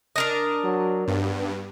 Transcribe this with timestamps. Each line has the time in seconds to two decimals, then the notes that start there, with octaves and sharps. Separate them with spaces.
0.16 D4 A#4 D#5
0.64 F#3
1.08 G2 B3